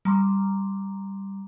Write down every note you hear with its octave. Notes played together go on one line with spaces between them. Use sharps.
G3 A#5 C6 D6